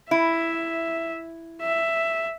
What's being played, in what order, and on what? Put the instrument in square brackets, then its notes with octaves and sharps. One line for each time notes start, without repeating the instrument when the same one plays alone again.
[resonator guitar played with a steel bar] E4 [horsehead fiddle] E5
[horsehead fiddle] E5